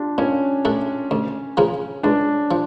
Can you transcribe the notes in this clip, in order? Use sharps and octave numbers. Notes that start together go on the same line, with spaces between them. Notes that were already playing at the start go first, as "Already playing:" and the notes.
Already playing: D4 F4 G4
A#2 C#4
A3 D4 A4
D2
C#3 F3 A#3
C#2 D4
F3